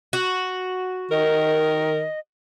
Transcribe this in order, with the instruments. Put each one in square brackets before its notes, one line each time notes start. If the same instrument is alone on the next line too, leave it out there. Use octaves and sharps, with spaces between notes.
[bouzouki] F#4
[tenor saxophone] D#3 [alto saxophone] A#4 [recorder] D#5